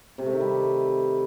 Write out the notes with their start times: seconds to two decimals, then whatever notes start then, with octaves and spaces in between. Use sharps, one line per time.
0.18 C3
0.26 A3
0.33 D#3
0.41 G3